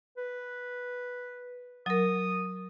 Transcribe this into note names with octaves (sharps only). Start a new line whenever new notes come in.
B4
F#3 A#4 D#6